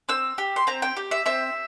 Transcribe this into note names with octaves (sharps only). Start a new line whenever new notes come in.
C4 E6
G4
C6
C4 A#5
G5
G4
E5
C4 E5